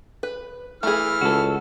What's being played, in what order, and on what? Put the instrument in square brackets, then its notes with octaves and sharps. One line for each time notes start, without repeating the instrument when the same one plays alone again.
[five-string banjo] B4
[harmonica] E3 F6 [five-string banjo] A3 G#4
[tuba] C#2 [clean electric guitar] F#4 A4